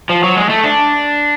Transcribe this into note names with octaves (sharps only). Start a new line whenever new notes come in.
F3
F#3
G#3
A3
D4